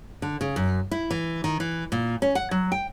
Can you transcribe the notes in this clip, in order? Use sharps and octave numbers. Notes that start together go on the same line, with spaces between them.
D3
C#3
F#2
E4
E3
D#3
E3
A#2
C#4
F#5
F#3
G5